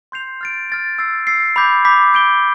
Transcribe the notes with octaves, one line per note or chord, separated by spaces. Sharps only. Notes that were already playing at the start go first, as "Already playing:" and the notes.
C6 G6 C7 F7
F6 A6 D7
F6 A6 D7
E6 A6 C7
E6 A6 C7
B5 D6 G6 B6
B5 D6 G6 B6
G6 D7 G7